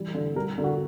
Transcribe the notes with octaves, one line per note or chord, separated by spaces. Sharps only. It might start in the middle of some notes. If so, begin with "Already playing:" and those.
Already playing: E3 G3
D3
G3 A#4
D3
F#4